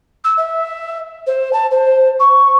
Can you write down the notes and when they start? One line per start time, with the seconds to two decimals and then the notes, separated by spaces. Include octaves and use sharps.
0.24 E6
0.37 E5
1.26 C5
1.53 A5
1.71 C5
2.19 C#6